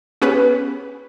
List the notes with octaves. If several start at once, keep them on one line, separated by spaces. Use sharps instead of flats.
B3 C#4 G4 G#4 B4